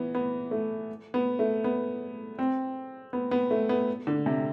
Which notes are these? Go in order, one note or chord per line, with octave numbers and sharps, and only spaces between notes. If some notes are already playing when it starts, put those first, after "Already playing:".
Already playing: E3 B3
B3
A3
B3
A3
B3
C4
B3
B3
A3
B3
D3
C3